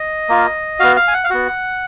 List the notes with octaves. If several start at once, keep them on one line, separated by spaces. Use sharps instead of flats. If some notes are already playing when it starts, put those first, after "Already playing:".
Already playing: D#5
A#3 F4
B3 F#4 F5
F5
G#5
F#5
F5
B3 F#4 F#5